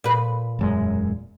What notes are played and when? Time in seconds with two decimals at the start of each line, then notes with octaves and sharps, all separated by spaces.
0.04 A#2 B4
0.59 E1 F#2 G#3